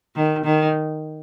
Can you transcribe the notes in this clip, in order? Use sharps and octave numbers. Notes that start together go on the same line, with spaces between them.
D#3
D#3